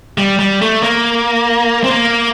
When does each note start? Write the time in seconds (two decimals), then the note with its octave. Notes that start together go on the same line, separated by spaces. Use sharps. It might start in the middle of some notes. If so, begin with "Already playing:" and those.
0.18 G3
0.39 G3
0.61 A3
0.83 A#3
1.84 C4
1.90 A#3